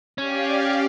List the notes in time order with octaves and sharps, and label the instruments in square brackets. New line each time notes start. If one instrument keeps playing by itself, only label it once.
[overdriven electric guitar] C#4 [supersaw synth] G4 D5 F5